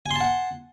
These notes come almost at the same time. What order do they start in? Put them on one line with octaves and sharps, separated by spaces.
G#5 C6 A5 F#5